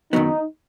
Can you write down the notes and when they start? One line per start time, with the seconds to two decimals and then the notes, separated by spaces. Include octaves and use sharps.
0.13 F#2 D#3 F#3 B3 D#4